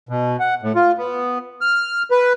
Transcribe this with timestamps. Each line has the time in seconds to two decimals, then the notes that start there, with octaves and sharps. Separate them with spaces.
0.09 B2
0.40 F#5
0.62 A2
0.75 F4
0.98 B3
1.61 F6
2.11 B4